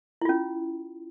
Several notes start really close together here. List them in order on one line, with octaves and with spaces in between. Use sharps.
E4 F4 C#4